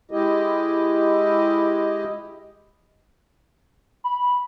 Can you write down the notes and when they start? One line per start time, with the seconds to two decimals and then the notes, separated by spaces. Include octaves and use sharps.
0.11 G#3 E4 G4 D#5
4.04 B5